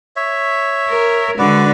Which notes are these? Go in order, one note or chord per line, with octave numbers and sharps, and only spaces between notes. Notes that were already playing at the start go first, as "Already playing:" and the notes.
C#5 E5
A#4
D3 G#3 F#4 B4 D5